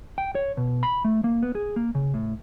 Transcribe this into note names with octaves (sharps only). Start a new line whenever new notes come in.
G5
C#5
B2
B5
A3
A#3
B3
G#4
A#3
C#3
A2